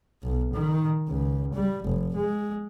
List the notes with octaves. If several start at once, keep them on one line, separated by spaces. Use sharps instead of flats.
B1
D#3
C#2
G3
F1
G#3